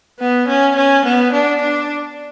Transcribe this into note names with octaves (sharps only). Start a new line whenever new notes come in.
B3
C#4
C#4
B3
D4
D4